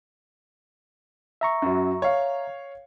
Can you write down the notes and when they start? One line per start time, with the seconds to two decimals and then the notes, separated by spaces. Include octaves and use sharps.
1.41 E5 A#5 C#6
1.62 F#2 F#3
2.02 C#5 F5